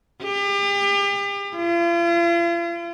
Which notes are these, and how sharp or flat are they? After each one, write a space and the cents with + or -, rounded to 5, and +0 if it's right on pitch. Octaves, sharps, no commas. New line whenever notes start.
G4 +40
F4 -45